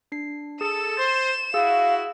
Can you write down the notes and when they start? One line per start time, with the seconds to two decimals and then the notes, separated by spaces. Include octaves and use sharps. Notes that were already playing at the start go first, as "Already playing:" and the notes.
0.12 D4 C7
0.61 G#4 A4 E7
0.97 C5 A6
1.54 E4 F#4 G#4 F5 E6